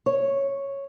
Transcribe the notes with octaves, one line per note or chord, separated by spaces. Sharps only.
C#5